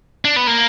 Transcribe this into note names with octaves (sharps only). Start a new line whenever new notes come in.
D4
B3
A#3